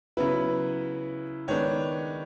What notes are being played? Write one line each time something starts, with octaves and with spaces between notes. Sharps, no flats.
C#3 F#3 B3 E4 B4
D#3 G#3 B3 D4 C#5